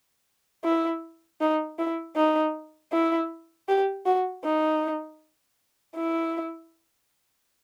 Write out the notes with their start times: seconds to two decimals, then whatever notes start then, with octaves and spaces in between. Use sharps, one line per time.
0.64 E4
1.41 D#4
1.78 E4
2.16 D#4
2.92 E4
3.68 G4
4.06 F#4
4.44 D#4
5.95 E4